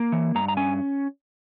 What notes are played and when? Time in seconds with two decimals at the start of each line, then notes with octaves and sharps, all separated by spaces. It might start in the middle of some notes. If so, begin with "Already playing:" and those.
Already playing: A#3
0.12 E3
0.35 G2 A#5
0.48 A#5
0.57 C#4 G#5